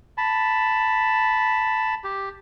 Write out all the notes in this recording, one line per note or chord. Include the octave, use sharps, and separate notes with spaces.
A5 B5
G4